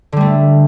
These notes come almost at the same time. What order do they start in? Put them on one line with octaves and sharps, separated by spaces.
D3 G3 A3